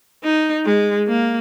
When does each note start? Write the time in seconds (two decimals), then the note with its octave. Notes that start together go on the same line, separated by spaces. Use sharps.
0.23 D#4
0.65 G#3
1.08 A#3